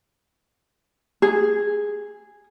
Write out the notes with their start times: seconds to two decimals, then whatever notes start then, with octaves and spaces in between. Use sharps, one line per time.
1.22 G#4